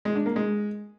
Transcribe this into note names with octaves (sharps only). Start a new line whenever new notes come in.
G#3
D4
A#3
G#3